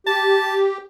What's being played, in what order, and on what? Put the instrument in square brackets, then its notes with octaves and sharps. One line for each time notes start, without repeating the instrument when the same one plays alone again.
[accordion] G4 [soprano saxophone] A5